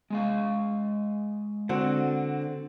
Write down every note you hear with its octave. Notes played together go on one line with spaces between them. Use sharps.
G#3 D#5 F5
D3 C4 F#4 F#5